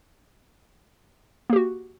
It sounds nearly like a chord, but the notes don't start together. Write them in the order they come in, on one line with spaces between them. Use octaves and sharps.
A#3 G4 F#4